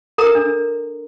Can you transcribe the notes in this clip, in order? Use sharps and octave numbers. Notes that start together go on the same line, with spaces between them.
A4 A#4 A#5
D4